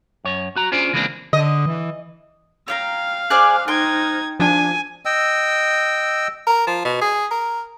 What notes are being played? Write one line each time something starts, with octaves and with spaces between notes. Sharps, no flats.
F#2 C#5
F#4 A#5
C#4 D4 F4 G#4 C5 D5
C#3 E3 G#3 A#3 C4 D4
D3 D#5
E3
C#5 F5 G5 A#5
G#4 C5 D5 G#5 F6 F#6
D#4 G5 C6 G#6
F3 D4 G#5
D#5 G5 E6
A#4
F3
B2
G#4
A#4